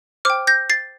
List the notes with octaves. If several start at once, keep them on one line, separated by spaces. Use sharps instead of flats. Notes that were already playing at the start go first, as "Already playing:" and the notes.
C5 G5 D6 F6
G6 A#6
A6 C7